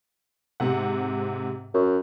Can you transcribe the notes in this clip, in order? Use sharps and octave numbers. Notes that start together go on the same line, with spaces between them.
G#2 C3 F#5
F#2